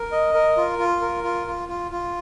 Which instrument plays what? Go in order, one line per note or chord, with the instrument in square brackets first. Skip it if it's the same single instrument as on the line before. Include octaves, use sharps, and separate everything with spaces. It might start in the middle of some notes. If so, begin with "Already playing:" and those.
Already playing: [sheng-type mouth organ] A#4
D#5
A#4
F4
F4
A#4
F4
F4
F4
F4